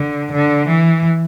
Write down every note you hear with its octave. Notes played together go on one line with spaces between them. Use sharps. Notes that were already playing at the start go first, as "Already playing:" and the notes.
Already playing: D3
D3
E3